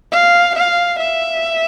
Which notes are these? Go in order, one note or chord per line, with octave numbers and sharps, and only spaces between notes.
F5
F5
E5